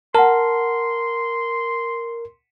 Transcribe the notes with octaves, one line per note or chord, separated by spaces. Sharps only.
A#4 F#5 A5 C6